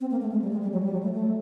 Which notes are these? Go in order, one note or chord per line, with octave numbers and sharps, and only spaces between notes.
C4
A#3
A3
G#3
G3
G#3
G3
F#3
G3
F#3
A3
A3